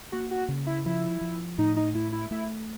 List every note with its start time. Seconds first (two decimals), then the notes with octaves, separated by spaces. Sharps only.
0.12 A#3 F#4
0.31 F#4
0.49 C#3
0.67 E4
0.86 F3 E4
1.21 F3
1.58 A2 D#4
1.77 D#4
1.94 A3 E4
2.12 E4
2.31 A3 E4